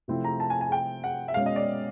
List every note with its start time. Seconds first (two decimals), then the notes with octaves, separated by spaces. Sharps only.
0.08 C3 F3 A3 C4 E4
0.24 A#5
0.40 A5
0.50 G#5
0.61 G#5
0.72 G5
1.04 F#5
1.28 E5
1.34 B2 G#3 C#4 F5
1.46 D#5
1.56 D5